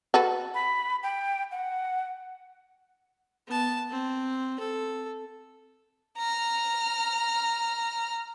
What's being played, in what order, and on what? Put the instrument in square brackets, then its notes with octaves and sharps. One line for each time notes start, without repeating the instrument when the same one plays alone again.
[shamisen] F#4 A4 B4
[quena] B5
G5
F#5
[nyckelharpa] B3 A5
C4
A4
[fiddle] A#5 F6